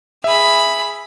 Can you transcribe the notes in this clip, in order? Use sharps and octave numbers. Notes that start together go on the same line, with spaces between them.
G#4 E5 B5